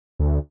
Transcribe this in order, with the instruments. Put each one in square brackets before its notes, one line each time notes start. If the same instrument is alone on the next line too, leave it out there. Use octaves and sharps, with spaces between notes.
[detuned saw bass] D2